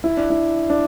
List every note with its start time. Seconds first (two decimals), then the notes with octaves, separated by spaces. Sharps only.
0.04 E4
0.17 D4
0.30 E4
0.70 D4